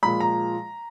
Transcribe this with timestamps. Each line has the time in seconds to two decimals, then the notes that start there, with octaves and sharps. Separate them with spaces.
0.03 A#2 F3 G#3 B5
0.20 A#5